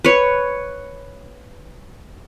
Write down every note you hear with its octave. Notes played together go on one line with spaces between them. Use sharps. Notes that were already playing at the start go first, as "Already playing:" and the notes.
B4 C#5